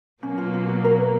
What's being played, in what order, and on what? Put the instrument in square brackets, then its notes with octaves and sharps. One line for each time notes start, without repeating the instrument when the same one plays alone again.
[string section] B2 F#3 A#3 [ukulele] C#4
[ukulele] F4
F4
F#4
A#4
B4